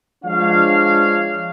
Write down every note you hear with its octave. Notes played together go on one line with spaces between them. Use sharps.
F3 G#3 D4 C#5 F5